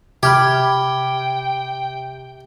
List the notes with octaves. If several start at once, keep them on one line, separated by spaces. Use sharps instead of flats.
C3 G4 G5 B5 F6 G#6